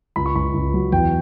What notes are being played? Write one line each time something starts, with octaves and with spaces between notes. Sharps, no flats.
C#2 B5
C#6
C#2 B5
C#2
F#3
E2 G5